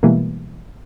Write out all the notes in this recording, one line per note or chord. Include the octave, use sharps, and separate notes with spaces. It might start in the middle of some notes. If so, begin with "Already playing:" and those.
B2 E3 G3 G#3 A#3